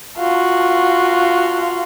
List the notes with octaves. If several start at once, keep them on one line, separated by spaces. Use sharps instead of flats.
F4 F#4